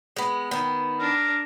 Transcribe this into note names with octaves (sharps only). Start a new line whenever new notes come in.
G#3 B3
D#3 B3
D4 A#4